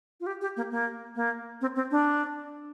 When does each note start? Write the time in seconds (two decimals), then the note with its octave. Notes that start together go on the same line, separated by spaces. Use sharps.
0.20 F4
0.26 G4
0.41 G4
0.57 A#3
0.71 A#3
1.16 A#3
1.61 C4
1.76 C4
1.91 D4